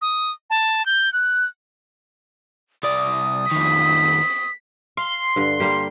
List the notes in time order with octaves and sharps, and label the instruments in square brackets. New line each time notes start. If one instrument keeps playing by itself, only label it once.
[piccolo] D#6
A5
G6
F#6
[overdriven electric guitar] C2 D5 [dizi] D#6
[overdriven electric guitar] F2 D#3 [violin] B6
[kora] F5 [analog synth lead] C6
[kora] G2 D3
G3 A#3 G4